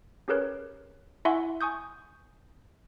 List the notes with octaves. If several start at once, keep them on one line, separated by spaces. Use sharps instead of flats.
C#4 G4 G#4 A#4 B4 C#5
E4 E5 F#5 G#5 C6 C#6
G#5 C#6 D#6 G6